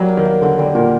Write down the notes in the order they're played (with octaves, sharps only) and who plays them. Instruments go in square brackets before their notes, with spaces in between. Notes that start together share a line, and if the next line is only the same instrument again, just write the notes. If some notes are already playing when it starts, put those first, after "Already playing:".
Already playing: [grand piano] F#3 [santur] G3 A#3 F#4
[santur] A#4
[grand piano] D#3
[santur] A#3
[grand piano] D3 [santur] F#4
[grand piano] D3 [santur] G3
[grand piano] A#2 [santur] A#4